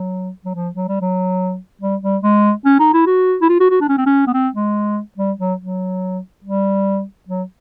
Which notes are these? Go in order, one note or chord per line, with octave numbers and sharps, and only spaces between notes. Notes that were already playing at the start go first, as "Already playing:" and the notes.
Already playing: F#3
F#3
F3
F#3
G3
F#3
G3
G3
G#3
C#4
D#4
E4
F#4
E4
F4
F#4
F#4
D4
C#4
C4
C#4
B3
C4
G#3
G3
F#3
F#3
G3
F#3